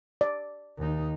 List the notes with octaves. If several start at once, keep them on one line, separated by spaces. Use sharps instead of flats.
D5
D#2 D#4